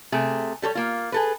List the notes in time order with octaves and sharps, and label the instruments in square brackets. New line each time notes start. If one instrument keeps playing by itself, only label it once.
[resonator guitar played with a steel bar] C3 A3 G#4
G3 A4 C5 C#5
A#3 F4
G#4 A4 B4